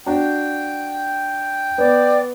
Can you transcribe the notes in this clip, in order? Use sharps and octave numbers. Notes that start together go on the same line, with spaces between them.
D4 F#4 G5
B3 D5